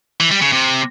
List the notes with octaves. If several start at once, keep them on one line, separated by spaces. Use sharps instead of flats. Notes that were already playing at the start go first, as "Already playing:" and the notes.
E3
G3
C#3
C3